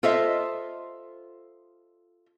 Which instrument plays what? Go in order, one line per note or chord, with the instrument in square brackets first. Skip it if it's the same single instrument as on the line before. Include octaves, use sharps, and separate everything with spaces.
[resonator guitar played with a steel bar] F4 A4 C5 D#5 E5